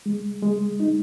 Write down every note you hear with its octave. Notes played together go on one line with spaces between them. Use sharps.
G#3
G#3
D#4